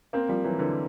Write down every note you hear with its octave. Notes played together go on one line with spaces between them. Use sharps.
A#3 C4
F3 G3
E3 F#3
D3 E3